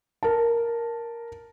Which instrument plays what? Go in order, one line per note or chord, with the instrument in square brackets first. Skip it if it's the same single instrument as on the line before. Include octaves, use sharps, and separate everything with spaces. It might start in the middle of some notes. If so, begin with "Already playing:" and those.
[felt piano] A#4 A5